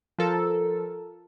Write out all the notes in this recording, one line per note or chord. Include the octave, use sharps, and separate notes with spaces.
F3 A4 A#4